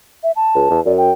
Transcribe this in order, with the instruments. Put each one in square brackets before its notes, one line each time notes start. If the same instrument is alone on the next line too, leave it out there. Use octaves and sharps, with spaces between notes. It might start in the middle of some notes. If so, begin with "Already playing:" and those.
[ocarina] E5
A5
[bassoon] C#2
E2
[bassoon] F#2 [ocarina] D5
[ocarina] G5